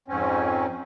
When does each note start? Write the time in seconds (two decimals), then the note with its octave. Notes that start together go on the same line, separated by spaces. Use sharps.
0.08 F2 G#2 C4 C#4